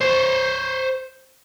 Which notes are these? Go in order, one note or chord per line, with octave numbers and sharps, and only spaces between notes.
C5 C#5